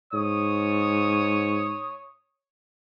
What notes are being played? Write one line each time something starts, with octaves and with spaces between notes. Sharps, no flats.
G#2 C#5 D#6